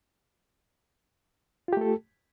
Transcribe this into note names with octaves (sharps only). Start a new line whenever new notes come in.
A3 F4 G4 A4